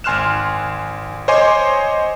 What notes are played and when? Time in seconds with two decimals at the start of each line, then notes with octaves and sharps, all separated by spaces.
0.04 G#1 G#5 C6 F6 F#6 E7
1.28 C5 C#5 D#5 G#5 C6 D6